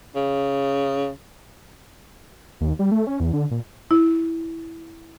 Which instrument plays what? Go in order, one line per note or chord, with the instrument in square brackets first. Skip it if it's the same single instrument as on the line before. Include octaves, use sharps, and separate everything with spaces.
[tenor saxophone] C#3
[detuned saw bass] D#2
G3
A3
C#4
E2
D3
A#2
[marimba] E4